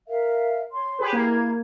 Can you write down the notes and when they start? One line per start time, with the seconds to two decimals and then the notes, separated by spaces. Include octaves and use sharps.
0.08 A#4 E5 F5
0.72 C#5 C6
0.99 G4 G#4 B4
1.13 A#3 E4 G#6